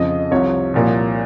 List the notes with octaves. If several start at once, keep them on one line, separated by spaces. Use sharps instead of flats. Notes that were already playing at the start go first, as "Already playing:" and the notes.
Already playing: F2 C#3 F3 D#5
C2 C3 F3 C#5
C2 A#2 F3